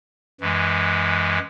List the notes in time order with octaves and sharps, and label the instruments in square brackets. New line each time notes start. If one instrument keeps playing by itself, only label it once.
[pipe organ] F#2 E3 G#3